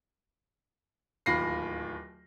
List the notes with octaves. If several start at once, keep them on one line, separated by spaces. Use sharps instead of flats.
D1 D#2 F4 B5 A#6 C7